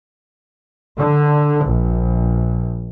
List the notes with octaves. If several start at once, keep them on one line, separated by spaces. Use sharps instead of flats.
D3
A#1